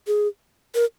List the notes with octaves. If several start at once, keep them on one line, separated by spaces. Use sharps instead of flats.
G#4
A#4